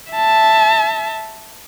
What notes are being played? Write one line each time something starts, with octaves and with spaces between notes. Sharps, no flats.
E5 A5